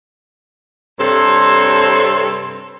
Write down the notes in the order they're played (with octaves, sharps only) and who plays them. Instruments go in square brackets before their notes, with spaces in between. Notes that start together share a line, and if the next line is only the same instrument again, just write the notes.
[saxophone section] G2 C3 C4 A4 C#5